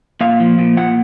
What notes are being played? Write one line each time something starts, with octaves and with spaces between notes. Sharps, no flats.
A#2 F5
F3
A#2
A#2 F#5